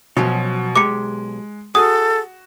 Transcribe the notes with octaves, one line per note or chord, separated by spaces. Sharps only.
B2 F3 F#3 C#4
B1 G#3 G4 A#5 D6 C#7
F#4 G#4 A4 D#6